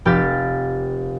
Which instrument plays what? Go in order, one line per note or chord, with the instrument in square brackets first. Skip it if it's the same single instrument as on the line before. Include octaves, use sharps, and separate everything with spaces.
[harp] F1 G4 F5 A6 B6